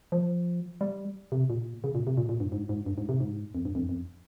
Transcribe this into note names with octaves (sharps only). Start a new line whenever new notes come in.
F3
G3
C3
A#2
C#3
A#2
C3
A#2
A#2
G2
G#2
G#2
G2
G#2
C3
G#2
F2
G2
F2
F2